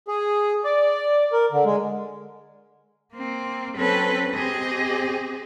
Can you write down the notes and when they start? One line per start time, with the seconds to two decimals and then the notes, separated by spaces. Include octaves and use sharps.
0.08 G#4
0.64 D5
1.33 A#4
1.52 D3
1.65 G#3
3.14 A#3 C4
3.77 F#3 C4 C#4 A4 B4
4.36 C4 G4 G#4 D#5